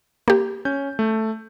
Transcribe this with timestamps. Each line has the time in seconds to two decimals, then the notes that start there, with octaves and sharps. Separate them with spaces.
0.28 A#3 G4
0.65 C#4 G6
0.99 A3